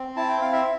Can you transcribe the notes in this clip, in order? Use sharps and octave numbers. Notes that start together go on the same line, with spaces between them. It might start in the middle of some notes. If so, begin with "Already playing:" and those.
Already playing: C4
E4 A5
G5
C4 F5
E5